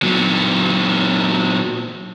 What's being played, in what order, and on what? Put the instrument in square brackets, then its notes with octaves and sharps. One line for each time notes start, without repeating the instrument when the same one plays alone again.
[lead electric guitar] A#2 F#3